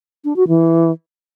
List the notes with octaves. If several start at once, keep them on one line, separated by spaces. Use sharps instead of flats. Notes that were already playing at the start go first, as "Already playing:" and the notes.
D4
F#4
E3